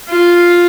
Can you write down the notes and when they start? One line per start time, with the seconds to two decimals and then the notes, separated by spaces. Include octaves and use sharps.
0.10 F4